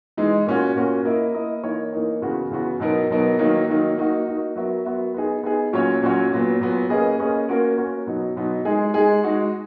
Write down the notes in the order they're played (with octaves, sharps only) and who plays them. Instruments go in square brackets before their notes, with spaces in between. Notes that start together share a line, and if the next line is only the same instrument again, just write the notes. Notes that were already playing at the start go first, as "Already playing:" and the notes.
[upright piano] E3 G#3 D#4
A#2 A#3 C#4 F#4
A#2 A#3 C#4 F#4
A#3 E4 A#4 D#5
A#3 E4 A#4 D#5
E3 A#3 D#4 A#4 C#5
E3 A#3 D#4 A#4 C#5
C#3 E3 B3 F#4
C#3 E3 B3 F#4
B2 F#3 B3 D#4 A#4
B2 F#3 B3 D#4 A#4
D#3 F#3 A#3 D#4
D#3 F#3 A#3 D#4
A#3 D#4 F#4
A#3 D#4 F#4
F#3 B3 F#4 A#4 E5
F#3 B3 F#4 A#4 E5
B3 D#4 G#4
B3 D#4 G#4
A#2 F#3 C#4 F#4 C#5
A#2 F#3 C#4 F#4 C#5
A#2 F#3 B3
A#2 F#3 B3
A#3 C#4 G#4 B4 D#5
A#3 C#4 G#4 B4 D#5
A#3 C#4 F#4 A#4
A#3 C#4 F#4 A#4
B2 F#3 B3 D#4
B2 F#3 B3 D#4
G#3 D#4 G#4
G#3 D#4 G#4
G#3 D#4 F#4